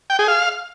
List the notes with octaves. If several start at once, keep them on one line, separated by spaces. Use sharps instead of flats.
G5
G#4
F5